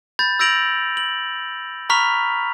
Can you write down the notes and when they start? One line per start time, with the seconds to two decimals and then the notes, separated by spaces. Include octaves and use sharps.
0.19 B5 G6 A6
0.39 E6 G6 A#6 D7 F7 F#7
0.97 F#7
1.90 A#5 B5 C#6 F6 B6 F7